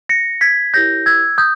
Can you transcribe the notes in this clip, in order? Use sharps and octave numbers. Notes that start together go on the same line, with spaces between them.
A#6 C#7
G#6 B6
E4 G4 A#4 C#5 G6 A#6
E6 G#6
D#6 G6